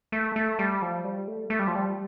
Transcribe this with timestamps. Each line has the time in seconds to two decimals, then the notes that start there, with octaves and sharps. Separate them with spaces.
0.12 A3
0.36 A3
0.59 G3
0.82 F3
1.05 G3
1.28 A3
1.50 A3
1.59 G3
1.67 F3
1.75 G3